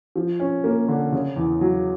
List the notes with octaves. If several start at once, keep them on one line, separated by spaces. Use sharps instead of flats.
F3
C#4
A#3
D3
C#3
E2
F#3